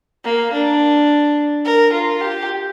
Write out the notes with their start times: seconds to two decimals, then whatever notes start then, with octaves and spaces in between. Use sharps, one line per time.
0.24 A#3
0.53 D4
1.65 A#4
1.93 F4
2.21 G4